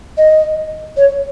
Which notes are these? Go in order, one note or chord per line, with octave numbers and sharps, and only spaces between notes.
D#5
C#5